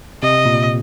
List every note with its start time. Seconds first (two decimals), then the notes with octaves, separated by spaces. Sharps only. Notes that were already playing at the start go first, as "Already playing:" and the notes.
0.22 C3 D#5
0.45 A#2